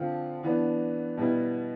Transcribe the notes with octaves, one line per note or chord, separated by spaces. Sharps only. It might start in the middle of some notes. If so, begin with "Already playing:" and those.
Already playing: D3 F3 C4 F4
E3 B3 D4
B2 G3 B3 E4